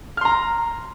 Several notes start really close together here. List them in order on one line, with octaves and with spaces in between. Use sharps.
F6 C6 A#5